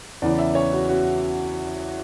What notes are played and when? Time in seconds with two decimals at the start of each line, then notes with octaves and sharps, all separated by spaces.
0.22 E2 C#3 E3 D5
0.39 E5
0.55 C#5
0.73 F#4
0.89 F#4